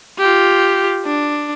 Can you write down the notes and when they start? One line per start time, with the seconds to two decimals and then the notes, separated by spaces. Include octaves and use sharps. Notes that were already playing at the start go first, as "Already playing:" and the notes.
0.19 F4 G4
1.05 D4